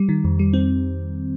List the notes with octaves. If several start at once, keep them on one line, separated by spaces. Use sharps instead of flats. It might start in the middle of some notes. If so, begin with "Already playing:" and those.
Already playing: G3
D#3
F2
G3
C4